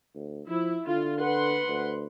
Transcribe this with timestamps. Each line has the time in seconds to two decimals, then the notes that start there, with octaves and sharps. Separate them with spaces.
0.15 D2
0.48 F3 E4
0.87 D3 F4
1.21 B4 F#5 C6
1.68 D2